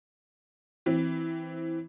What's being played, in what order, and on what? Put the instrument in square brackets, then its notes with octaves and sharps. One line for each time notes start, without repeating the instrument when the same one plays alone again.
[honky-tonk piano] E3 C4